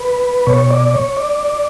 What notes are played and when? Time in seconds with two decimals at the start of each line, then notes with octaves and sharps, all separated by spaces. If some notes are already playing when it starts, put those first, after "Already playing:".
Already playing: B4
0.47 B2 C#5
0.70 D5
0.93 C#5
1.17 D5